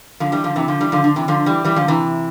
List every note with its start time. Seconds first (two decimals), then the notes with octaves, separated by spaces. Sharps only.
0.20 D3 F3
0.32 E3 G3
0.44 D3 F3
0.56 C3 E3
0.68 D3 F3
0.80 E3 G3
0.92 D3 F3
1.04 D3
1.16 C3 E3
1.28 D3 F3
1.46 E3 G3
1.65 E3 G3
1.76 D3 F3
1.88 C3 E3